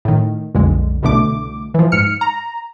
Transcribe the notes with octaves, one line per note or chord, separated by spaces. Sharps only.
A2 D#3
B1 F2 D3 G#3
C2 B2 D3 A3 D6
E3 F3
G#2 F6 C#7
A#5